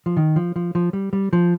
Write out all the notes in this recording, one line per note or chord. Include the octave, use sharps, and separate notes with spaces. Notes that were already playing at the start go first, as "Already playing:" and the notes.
F3
D#3
F3
F3
F3
G3
G3
F3